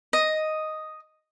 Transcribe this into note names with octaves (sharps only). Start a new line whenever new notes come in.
D#5